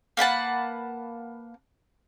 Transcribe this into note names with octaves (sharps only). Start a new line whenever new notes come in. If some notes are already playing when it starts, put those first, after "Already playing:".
A#3 B4 F#5 A5